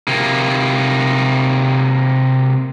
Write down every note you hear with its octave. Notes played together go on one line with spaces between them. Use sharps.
C3 A#3